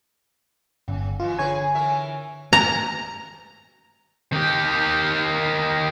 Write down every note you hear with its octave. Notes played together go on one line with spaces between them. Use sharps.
G1 C#3
B2 E3 F4
D3 G#4 B4 C#5 G#5
E3 A#4 E5
A#5
D#3 G4